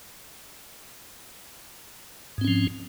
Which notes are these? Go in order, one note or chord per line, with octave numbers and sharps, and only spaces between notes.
G#2 F3 C4 C#4